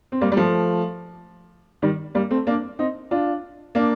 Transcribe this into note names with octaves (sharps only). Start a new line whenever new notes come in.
C4
G3 A#3
G3
F3 A3
D#3 G3
G3 A#3
A3 C4
A#3 D4
C4 D#4
D4 F4
A#3 D4